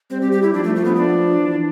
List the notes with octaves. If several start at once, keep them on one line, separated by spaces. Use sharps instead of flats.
G3 C4
G4
G4
E4
F3 D4
A3
A3
B3
D4
E3